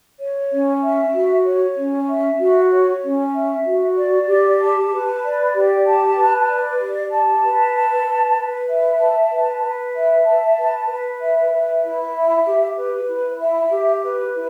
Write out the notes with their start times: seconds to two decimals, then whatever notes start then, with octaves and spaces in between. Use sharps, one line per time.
0.19 C#5
0.51 C#4
0.82 E5
1.13 F#4
1.45 C#5
1.76 C#4
2.07 E5
2.39 F#4
2.70 C#5
3.02 C#4
3.34 E5
3.65 F#4
3.97 D5
4.27 G4
4.60 A5
4.91 B4
5.22 D5
5.54 G4
5.85 A5
6.16 B4
6.48 D5
6.79 G4
7.11 A5
7.42 B4
7.73 A5
8.05 B4
8.36 B4
8.68 E5
8.99 A5
9.31 B4
9.62 B4
9.94 E5
10.25 A5
10.56 B4
10.88 B4
11.19 E5
11.51 B4
11.82 E4
12.14 E5
12.45 G4
12.77 B4
13.08 E4
13.39 E5
13.71 G4
14.02 B4
14.34 E4